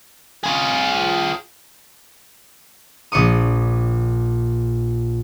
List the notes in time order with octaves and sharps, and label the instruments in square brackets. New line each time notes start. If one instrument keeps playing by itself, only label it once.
[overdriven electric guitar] F4 G#4
[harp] A#1 D5 C#6 D#6